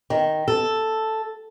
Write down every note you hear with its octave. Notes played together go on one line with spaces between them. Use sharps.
D#3
A4